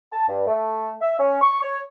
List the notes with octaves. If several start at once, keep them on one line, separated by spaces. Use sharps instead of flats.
A5
G2
A3
E5
C#4
C#6
C#5